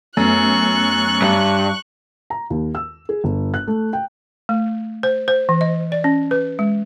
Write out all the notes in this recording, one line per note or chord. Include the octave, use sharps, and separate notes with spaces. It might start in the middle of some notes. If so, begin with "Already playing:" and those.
F#2 A3 B3 C#6 F#6
G2
A#5
D#2
E6
G#4
G1
F#6
A3
G5
A3
C5
C5
E3
D#5
D5
C#4
B4
G#3